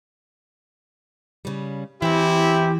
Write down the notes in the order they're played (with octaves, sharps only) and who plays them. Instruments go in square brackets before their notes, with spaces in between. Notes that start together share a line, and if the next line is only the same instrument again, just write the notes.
[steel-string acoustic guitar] C#3 G3
[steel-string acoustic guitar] E2 E3 [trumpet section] C4 E4 [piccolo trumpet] G4